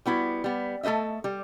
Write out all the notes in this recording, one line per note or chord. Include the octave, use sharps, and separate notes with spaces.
G3 B3 E4 F#4
G3 B3
A3 A4 C5 D#5 E5
G3